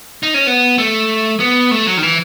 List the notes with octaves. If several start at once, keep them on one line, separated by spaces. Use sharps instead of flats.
D#4
C#4
B3
A3
B3
A3
F#3
D#3
E3